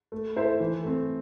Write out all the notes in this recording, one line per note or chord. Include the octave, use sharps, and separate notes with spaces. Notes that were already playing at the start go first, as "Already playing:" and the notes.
A3
E4 A4 C5 E5
E3
A3 C4